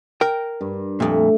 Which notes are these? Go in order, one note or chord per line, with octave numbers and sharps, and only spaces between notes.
A#4 G5
G2
F2 A#2 A3